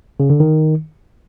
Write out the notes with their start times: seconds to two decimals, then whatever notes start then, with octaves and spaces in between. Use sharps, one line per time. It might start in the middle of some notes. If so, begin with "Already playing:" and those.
0.20 C#3
0.30 D3
0.40 D#3